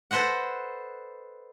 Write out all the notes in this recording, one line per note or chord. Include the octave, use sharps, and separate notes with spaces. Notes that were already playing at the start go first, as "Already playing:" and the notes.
A4 B4 C5 D#5 F#5